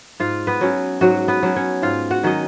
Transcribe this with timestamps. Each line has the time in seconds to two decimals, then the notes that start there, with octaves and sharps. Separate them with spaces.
0.20 G#2 F4 F5
0.47 B3 B4
0.61 F#3 C#4
1.01 G#2 F#3 F#4
1.28 B3 B4
1.43 F#3 C#4
1.56 C#4 C#5
1.82 G#2 F4 F5
2.11 F#4 F#5
2.23 D#3 F#3 C#4 D#5